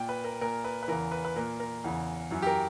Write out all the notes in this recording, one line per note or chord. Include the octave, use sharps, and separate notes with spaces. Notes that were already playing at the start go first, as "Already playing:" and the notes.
Already playing: A#2 G5
B4
A#4
A#2 A#4
B4
B4
E2 C#3 E3 A#4
B4
B4
A#2 A#4
A#4
E2 C#3 E3
F#2 E3
G4
A#4